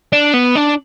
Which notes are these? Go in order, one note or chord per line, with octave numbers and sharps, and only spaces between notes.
D4
B3
D4